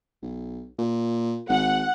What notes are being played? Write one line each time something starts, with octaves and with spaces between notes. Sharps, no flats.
B1
A#2
G#1 F#5